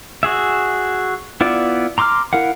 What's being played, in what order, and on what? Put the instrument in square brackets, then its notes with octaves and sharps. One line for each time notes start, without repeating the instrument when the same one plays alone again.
[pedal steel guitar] F#4 G#4 E5
B3 E4 F4 D5
A#5 C6 D6 E6 F6
E4 A#4 F5 F#5